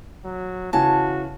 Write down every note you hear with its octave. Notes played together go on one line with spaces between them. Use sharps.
F#3
C#3 E3 F#4 G#5 A5